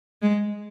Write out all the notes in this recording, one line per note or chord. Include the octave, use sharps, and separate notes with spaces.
G#3